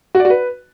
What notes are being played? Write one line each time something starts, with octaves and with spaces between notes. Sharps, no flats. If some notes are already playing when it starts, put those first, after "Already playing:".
F#4
D5
F#4
B4